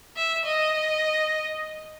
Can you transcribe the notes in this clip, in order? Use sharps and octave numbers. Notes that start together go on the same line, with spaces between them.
E5
D#5